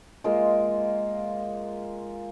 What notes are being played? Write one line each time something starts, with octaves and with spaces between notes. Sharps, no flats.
G#3 A#3 F4